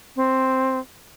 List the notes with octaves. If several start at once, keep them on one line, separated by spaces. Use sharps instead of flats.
C4